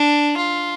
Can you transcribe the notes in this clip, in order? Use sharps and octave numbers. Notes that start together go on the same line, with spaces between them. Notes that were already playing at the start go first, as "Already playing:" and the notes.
Already playing: D4
F4